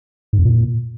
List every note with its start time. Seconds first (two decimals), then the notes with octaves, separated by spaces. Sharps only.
0.33 G#2
0.39 F2
0.45 A#2